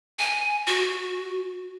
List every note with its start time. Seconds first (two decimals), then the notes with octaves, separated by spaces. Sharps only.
0.19 G#5
0.67 F#4